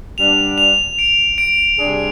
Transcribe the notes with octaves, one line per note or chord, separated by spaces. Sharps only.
G3 B3 D4 F7
F7
D7
D7
C3 G3 D4 G#4